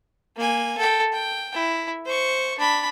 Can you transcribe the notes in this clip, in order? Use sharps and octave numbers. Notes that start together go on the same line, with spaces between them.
A#3 G#5
A4 G5
G5
E4
C5 C#6
D4 B5